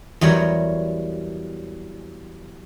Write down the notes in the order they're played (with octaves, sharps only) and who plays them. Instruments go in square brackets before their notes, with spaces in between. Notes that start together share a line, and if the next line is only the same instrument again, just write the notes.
[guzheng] E2 F#3 G3 A#4 C#5